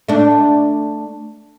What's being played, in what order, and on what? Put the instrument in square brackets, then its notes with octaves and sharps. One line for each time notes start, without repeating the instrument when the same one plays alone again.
[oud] A3 D4